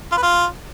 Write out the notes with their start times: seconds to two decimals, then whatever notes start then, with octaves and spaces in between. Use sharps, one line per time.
0.12 F4
0.17 B4
0.22 F4